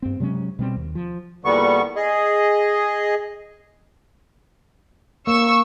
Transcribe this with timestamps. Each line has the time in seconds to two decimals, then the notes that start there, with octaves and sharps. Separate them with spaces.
0.02 G2 C4
0.20 C3 F#3 G#3 C#4
0.59 B2 G3 C4
0.77 D#2
0.95 F3
1.45 E2 A#2 D3 G3 B3 C#6
1.96 G#4 D#5
5.27 A#3 C#6 E6